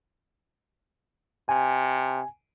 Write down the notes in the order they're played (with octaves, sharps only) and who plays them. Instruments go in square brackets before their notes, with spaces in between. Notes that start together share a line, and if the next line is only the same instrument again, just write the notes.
[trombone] C3 [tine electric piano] G#5